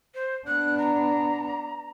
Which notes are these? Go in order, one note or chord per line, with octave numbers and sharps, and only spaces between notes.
C5
B3 D4 F#6
A#5